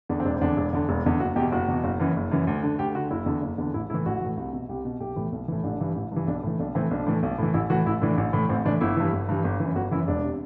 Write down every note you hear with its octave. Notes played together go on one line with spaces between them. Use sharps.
E2 D3 D4
C4
E1 D4
C4
E2 D3 D4
E1
E2 D3
E1
E2 D3
F#1 F#4
E2 B2 G4
F#1 F#4
E2 B2
F#1
F#2 E3
F#1
F#2 E3
D2
D3
D2 G4
D3 F#4
F#1 E4
E2 D3
F#1
E2 D3
A1 E4
A2 E3 E4
A1 F#4
A2 E3
C2
B2
C2 G4
B2
B1 G4
A2 E3
B1
A2 E3
A1 D4
G2 E3
A1
G2 E3
B1 D4
A2 E3
B1 D4
A2 E3 C4
B1 D4
A2 E3
B1
A2 E3
A1 E4
A2 E3 F#4
A1 E4
A2 E3 D4
A1
A2 E3
A1 C4
A2 E3 D4
G1 E4
G2 E3
G1
G2 E3
G1
F#2 E3
G1 F#4
F#2 E3 E4
E1 D4
C3